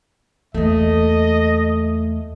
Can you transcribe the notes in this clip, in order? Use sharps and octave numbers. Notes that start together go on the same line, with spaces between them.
E2 A3 A#3 D#5